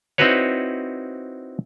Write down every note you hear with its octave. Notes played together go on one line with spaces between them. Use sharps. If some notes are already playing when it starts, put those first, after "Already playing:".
C4 D#4 E4 F#4 B4 C#5